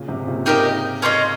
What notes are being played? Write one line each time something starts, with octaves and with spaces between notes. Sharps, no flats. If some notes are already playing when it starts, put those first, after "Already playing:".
Already playing: A#2 C#3
G#2 C3
A#2 C#3
D#4 G4 A#4 D#5
C#4 F4 C5 D#5